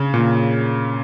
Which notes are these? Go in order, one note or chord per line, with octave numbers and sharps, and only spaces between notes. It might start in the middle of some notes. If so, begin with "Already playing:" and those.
Already playing: C#3
A#2